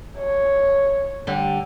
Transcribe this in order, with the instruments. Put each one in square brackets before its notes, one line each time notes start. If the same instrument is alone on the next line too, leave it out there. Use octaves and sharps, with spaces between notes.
[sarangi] C#5
[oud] D3 G3